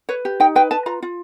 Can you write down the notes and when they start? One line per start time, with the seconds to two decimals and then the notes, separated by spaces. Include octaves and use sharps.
0.09 B4 C#5
0.25 G4
0.40 D#4 G5
0.55 B4 G5
0.71 B4 A5
0.86 F4 A#5
1.02 F4